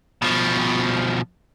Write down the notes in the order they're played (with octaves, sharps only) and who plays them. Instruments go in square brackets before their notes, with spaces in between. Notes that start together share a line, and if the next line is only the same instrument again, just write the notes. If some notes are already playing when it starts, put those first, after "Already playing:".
[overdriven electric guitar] B2 F3